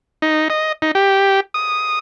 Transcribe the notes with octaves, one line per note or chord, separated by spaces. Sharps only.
D#4
D#5
D#4
G4
D#6